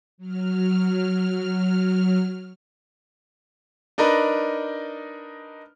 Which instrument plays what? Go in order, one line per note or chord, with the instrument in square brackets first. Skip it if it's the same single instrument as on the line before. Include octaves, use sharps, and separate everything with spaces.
[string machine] F#3 F6
[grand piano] D4 D#4 A#4 B4